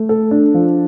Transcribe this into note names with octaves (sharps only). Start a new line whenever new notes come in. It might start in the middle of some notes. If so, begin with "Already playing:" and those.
Already playing: A3
A4
D4
F3